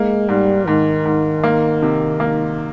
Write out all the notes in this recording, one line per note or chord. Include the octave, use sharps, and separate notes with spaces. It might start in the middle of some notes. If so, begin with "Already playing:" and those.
Already playing: G#3 A#3
G#2 G3
G#2 D#3
G#2
A#3
C3
A#3